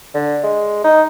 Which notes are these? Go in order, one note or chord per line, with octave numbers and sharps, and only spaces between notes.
D3
G#3
D#4